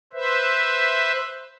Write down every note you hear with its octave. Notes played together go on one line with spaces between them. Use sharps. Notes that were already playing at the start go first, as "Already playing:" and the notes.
B4 C5 E5